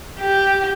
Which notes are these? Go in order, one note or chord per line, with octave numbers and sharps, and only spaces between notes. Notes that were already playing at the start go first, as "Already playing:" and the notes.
G4